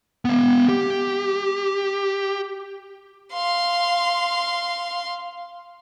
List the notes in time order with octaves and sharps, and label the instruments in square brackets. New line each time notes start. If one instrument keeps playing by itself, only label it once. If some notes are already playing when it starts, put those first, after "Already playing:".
[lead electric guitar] B3 F5
G4
[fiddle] F5 C6